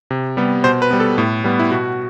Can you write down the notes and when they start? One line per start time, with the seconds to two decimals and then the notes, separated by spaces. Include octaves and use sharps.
0.11 C3
0.37 G3 B3
0.64 B2 C5
0.82 B4
0.91 G3 B3
1.00 A4
1.18 A2
1.44 G3 B3
1.59 E4
1.71 B2 F#4